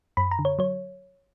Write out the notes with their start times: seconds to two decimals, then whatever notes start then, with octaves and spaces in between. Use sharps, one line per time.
0.17 F#2 B5
0.31 A#5
0.39 D3
0.45 C#5
0.59 F#3 C#5